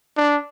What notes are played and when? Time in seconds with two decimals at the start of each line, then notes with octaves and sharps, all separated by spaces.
0.17 D4